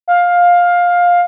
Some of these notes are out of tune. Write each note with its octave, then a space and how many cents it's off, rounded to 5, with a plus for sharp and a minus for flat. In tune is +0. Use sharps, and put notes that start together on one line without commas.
F5 +15